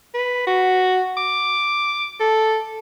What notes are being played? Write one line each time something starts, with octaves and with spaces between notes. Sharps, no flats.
B4
F#4
D6
A4